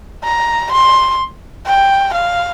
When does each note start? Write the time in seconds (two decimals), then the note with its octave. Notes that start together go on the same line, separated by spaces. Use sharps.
0.24 A#5
0.72 C6
1.66 G5
2.14 F5